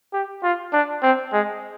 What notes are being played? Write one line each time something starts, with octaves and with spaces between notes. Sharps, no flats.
G4
F4
D4
C4
G#3